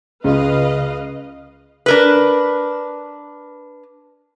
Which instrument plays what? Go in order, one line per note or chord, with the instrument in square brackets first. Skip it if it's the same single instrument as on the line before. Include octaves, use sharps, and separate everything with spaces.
[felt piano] C#2 [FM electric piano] C#3 F4 [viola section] B4 D#5 F5
[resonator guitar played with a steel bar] D4 A#4 B4